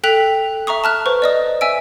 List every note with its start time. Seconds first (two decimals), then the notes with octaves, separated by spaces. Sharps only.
0.04 A4 G5 F#6 B6 F7
0.67 E5 A#5 C#6 D#6
0.84 A5 F6 F#6
1.06 B4 C5 C#6
1.22 D5 D#5 D#6
1.61 E5 G#5 E6 D7